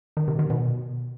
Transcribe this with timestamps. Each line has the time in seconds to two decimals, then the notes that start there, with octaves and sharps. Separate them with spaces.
0.17 D#3
0.28 C3
0.39 D#3
0.50 B2